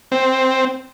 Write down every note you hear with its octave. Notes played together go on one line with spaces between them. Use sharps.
C4